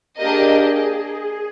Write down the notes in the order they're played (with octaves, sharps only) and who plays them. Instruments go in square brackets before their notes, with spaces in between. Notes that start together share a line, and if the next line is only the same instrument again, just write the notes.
[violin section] A#3 D4 G4 A#4 D#5 [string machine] G#4